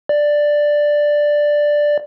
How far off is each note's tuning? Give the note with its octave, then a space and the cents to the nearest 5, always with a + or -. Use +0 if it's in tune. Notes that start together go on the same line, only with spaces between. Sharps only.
D5 +5